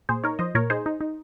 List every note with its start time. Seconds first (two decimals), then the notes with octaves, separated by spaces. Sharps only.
0.09 A#2 G#4 C5
0.24 D#4 A#4 C#5
0.39 F3 C5 D#5
0.55 A#2 A#4 C#5
0.70 D#4 G#4 C5
0.86 D#4
1.01 D#4